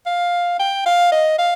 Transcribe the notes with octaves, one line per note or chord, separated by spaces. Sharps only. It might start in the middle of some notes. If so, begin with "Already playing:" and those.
F5
G5
F5
D#5
F5